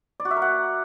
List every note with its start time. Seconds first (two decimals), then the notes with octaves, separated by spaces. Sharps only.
0.20 D5
0.25 F#4
0.31 E5
0.36 A#4
0.42 F#5